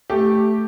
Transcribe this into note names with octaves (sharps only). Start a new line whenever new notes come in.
A3 G4